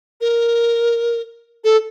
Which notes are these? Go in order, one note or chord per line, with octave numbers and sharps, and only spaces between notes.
A#4
A4